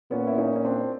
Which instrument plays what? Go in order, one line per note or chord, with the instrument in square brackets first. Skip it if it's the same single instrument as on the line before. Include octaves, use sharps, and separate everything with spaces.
[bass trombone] A#2 [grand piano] B3 C#4
[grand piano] E4
C#4 D#4
C#4
C4 D4